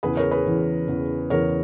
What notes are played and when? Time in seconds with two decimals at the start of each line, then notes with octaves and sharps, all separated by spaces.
0.03 E2 C#3 E3 G#4 B4
0.17 A#4 C#5
0.31 G#4 B4
0.46 E2 C#3 E3
0.88 E2 C#3 E3
1.30 E2 C#3 E3 A#4 C#5